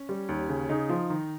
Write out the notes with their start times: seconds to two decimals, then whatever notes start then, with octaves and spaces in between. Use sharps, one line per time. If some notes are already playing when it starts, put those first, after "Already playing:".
Already playing: C#4
0.09 G3
0.29 D#2
0.49 C#3
0.69 C#3 D#4
0.89 F3
1.10 D#3